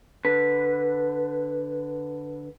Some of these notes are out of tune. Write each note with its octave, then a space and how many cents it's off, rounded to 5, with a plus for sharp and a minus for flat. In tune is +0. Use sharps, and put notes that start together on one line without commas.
D3 +0 B4 +0